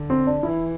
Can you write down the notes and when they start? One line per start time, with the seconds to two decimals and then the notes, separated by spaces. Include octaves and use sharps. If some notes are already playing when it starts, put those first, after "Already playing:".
Already playing: D3
0.10 C4
0.27 D4
0.43 E3 E4